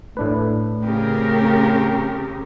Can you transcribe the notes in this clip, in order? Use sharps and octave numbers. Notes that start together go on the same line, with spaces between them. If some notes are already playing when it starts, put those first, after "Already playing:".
A2 A3 D4 B4
C#3 C4 G4 A#4